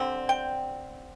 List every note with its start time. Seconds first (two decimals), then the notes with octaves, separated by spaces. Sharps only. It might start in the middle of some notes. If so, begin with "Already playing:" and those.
Already playing: D3 G3 C4
0.29 G5